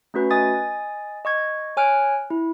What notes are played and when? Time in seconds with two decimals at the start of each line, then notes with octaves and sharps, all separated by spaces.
0.14 A3 C#4 F#4 B4
0.31 D#5 G#5 D#6 A6
1.25 D#5 C#6 G#6
1.77 C#5 G#5 F6 F#6 D7
2.30 E4